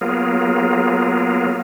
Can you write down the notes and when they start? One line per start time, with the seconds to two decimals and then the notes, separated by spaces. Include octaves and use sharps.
0.01 F#3 A#3 B3 F4 G#4 A#4